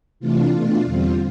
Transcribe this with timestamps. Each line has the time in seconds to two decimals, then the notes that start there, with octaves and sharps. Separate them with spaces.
0.20 C3 E3 A3 D4 F4
0.53 B2 A3 D4
0.85 E2 D3 G3 C4